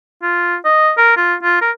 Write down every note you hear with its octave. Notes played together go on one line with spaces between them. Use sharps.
F4
D#5
A#4
F4
F4
A#4